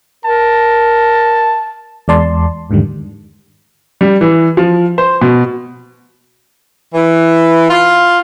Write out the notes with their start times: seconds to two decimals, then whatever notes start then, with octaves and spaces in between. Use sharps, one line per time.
0.25 A#4 A5
2.08 E2 G#3 D5 A5 C6
2.70 E2 G#2 D3 D#3 G3
4.01 G3
4.21 E3
4.57 F3
4.98 C5
5.21 B2
6.94 E3
7.70 F4